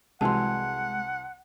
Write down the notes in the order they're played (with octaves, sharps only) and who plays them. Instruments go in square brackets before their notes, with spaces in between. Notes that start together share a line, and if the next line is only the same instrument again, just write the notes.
[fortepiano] C2 E3 F#3 [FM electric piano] G#3 [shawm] F#5 [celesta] A5 C6